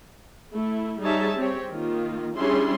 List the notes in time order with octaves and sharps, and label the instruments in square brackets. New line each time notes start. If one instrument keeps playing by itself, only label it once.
[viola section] A3 E4
G3 D#4 G#4 C#5 E5 A5
C4 G4 C#5
D#3 A#3 F4
G3 C#4 D4 E4 G#4 C6